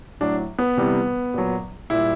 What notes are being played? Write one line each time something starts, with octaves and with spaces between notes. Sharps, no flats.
A2 F#3 D4
B3
C3 E3 G3
A#2 F#3
A#2 G3 E4